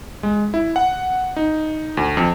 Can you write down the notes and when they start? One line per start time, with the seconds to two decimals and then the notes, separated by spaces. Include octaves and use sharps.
0.23 G#3
0.54 E4
0.76 F#5
1.36 D#4
1.97 D2
2.17 F2